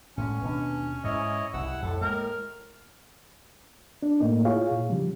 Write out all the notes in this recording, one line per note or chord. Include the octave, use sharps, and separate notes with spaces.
A2 D3 G#3 C#4
D#2 B2 D4
G#2 E4 C#5 D#5
C2 C#3 G3 E4 F#5 E6
F2 A2 F3 A4
G#3 A#3 A#4
D4
A2 A3 A#3 D#4
E4 F4 G#4 C#5 F5
A#2
C#3 F3 G3